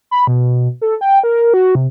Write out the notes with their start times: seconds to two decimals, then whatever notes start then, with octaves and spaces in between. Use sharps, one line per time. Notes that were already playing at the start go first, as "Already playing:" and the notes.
0.11 B5
0.27 B2
0.82 A4
1.01 G5
1.24 A#4
1.54 F#4
1.75 C3